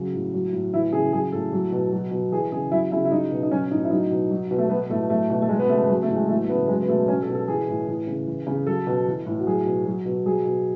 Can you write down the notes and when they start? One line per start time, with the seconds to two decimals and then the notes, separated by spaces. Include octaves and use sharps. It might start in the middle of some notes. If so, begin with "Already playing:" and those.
Already playing: C#3 F#3
0.13 A2
0.34 F#3
0.52 A2
0.74 E3 E4
0.92 C#3 G#4
1.13 F#3 G#4
1.32 A2 A4
1.53 F#3
1.72 B2
1.92 F#3
2.11 B2
2.31 E3 G#4
2.52 C#3 G#4
2.72 F#3 E4
2.92 C#3 E4
3.05 E4
3.11 F#3 D#4
3.31 B2
3.43 D#4
3.51 F#3 C#4
3.71 A2 D#4
3.84 E4
3.91 F#3 D#4
4.11 B2
4.31 F#3
4.51 B2
4.58 A3
4.69 F#3 B3
4.89 A2 A3
5.10 F#3 A3
5.30 B2
5.42 A3
5.49 F#3 G#3
5.59 B3
5.69 C#3 A3
5.89 F#3 G#3
6.03 A3
6.08 A2
6.16 G#3
6.28 E3 A3
6.44 A3
6.49 C#3 B3
6.68 F#3 G#3
6.82 B3
6.88 B2 A3
7.08 F#3 C#4
7.22 A4
7.29 B2
7.34 A4
7.48 E3 G#4
7.68 A2
7.88 E3
8.07 C#3
8.27 E3
8.47 C#3
8.67 F#3 A4
8.87 B2
9.07 E3
9.26 A2
9.40 F#4
9.47 F#3 G#4
9.66 B2
9.86 F#3
10.06 B2
10.25 F#3 G#4
10.45 B2